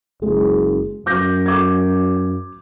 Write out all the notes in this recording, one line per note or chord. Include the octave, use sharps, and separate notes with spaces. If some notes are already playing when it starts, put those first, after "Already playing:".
F#1 G#3
F#2 D6 G6 A#6
D6 G#6